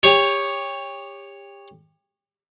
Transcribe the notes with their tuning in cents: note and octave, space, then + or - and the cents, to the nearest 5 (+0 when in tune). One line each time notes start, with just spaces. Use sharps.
G4 +30 C#5 +0